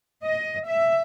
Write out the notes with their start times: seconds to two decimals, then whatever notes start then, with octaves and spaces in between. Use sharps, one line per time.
0.24 D#5
0.66 E5